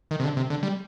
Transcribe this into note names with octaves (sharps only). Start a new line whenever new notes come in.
D#3
C3
D3
C3
D3
G3